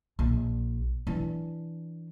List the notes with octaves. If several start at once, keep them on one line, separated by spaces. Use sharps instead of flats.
A#1
E3 D4